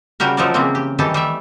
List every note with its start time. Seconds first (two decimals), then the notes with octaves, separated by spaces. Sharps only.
0.20 C#3 G3 F#4 G4 A#4
0.37 F3 F#3 D#4 A4 A#4 D5
0.54 C#3 E3 F3 A#3 C4
0.75 G4
0.99 D#3 E3 G3 G4 A4 A5
1.14 G3 A3 E5